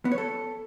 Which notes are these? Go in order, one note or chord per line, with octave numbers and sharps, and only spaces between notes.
B3
C#5
A4